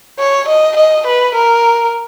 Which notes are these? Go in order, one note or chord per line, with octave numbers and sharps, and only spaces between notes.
C#5
D#5
D#5
B4
A#4